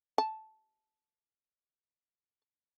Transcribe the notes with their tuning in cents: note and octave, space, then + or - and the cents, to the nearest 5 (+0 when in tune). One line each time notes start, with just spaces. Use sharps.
A5 -10